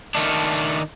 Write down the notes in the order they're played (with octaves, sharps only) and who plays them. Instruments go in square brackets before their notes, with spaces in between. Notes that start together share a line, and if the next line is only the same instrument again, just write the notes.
[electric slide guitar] D#3 A3 D4